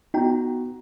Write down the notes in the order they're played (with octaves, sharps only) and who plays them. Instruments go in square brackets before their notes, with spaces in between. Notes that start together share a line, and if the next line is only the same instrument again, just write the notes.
[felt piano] B3 F#4 A#5 [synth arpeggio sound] D#4 G5